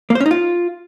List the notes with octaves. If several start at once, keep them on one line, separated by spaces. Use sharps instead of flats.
A#3
C5
C#4
D#4
F4